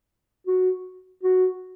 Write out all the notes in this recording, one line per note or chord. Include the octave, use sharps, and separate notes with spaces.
F#4
F#4